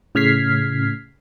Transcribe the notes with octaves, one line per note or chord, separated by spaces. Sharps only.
A2 C#3 F6 G#6 B6 C7